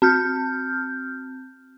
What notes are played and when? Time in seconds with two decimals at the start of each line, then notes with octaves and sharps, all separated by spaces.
0.02 C4 F6 G6